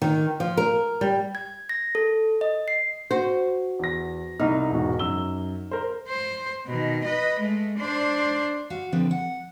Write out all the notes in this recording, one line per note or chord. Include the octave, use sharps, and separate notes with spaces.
D#3
F3
A#4
G3
G#6
A#6
A4
D#5
C7
F#4 C5
E2 A#6
C2 D#4 F6
E1 G#2 F#4
F#2 E6 G7
A#4 C5
C5
B2 D#3
B4 D#5
G#3 A3
D4 C5
F#4 F5
D3 F3 C4 B4
F#5